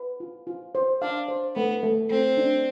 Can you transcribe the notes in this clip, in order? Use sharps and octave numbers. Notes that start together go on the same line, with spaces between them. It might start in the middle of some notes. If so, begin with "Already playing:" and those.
Already playing: B4
F4
F4
C5
D4 F5
C5
A3 B3
A3
A3 C4
D4